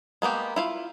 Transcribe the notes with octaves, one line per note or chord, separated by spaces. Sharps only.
G#3 A#3 B3 G4
E4 F4 F5